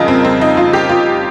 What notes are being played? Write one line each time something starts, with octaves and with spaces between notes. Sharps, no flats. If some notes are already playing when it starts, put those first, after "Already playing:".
Already playing: F2 C#3 G3 F4 G#4 A#4 D#5
C4
C4
D#4
F4
G4
F4